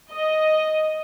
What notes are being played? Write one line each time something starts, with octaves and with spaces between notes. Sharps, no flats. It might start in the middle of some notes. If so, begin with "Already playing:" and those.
D#5